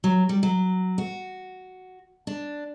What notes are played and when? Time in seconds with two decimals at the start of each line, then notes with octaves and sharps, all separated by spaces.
0.04 F#3
0.29 G3
0.43 F#3
0.98 F#4
2.27 D4